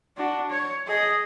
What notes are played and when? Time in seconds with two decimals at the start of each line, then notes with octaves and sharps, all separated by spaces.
0.17 D4 F#4
0.50 C#5
0.87 G#4 D#5